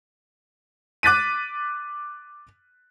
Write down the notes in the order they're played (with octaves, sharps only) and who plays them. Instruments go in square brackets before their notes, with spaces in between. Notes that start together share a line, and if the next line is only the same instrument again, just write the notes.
[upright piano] D6 F#6 A6 B6 D#7